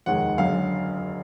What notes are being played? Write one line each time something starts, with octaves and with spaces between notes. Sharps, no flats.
F1 D#2 D#3 G#3 F#5
F#1 F#2 D3 F5